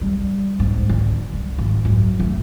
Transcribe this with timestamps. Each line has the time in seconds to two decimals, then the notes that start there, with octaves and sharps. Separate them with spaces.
0.01 G3
0.60 G#2
0.89 D3
1.34 G2
1.58 G#1
1.85 F#2
2.20 A3